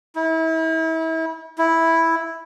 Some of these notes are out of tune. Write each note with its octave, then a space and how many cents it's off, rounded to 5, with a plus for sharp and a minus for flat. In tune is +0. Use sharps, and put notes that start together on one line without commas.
E4 -35
E4 -5